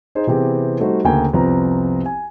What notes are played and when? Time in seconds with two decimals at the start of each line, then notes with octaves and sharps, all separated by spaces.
0.15 D#4 G#4 C5 D#5
0.27 C3 E3 B3 C4 G4 G#4
0.80 G3 A3 D#4 F#4 C5
1.04 D2 C#3 A#3 G5 G#5
1.34 C2 F2 F3 B3 C4 A#5
2.06 G#5